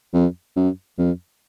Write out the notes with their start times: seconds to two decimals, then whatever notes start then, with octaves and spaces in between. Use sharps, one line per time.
0.14 F2
0.56 F#2
0.98 F2